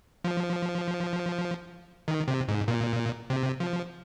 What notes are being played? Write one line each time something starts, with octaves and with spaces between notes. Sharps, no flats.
F3
D#3
C3
G#2
A#2
C3
F3